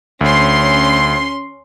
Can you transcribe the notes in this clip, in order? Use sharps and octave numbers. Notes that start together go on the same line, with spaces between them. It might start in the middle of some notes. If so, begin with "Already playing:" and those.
D2 C#4 C6